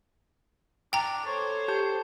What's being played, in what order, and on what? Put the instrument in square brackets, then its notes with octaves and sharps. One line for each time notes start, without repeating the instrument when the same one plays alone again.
[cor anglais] D4 [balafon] G5 A#5
[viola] A4 C5 [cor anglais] C#5
[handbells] G4 A5 G6